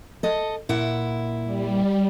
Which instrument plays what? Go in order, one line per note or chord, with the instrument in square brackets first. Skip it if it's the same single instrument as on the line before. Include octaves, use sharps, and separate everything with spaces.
[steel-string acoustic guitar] A4 D#5
A#2 E4 F#5
[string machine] G3